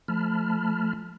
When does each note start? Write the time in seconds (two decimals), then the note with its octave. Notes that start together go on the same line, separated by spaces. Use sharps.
0.08 F3 A3 A5 B5 F6